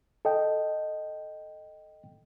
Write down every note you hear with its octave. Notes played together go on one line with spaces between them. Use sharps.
A4 D#5 G5